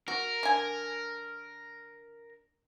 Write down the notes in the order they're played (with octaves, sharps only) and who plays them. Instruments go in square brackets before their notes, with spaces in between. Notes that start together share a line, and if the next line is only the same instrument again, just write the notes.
[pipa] F#4 [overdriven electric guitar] A#4
[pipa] D3 G#5